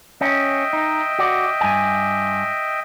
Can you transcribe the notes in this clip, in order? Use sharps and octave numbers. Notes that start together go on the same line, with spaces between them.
C#4 D#5 E5 G5
D#4
F#4 D5
G2 G#5